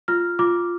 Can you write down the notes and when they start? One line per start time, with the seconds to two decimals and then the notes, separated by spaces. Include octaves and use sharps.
0.08 F4 F6
0.39 F4 D6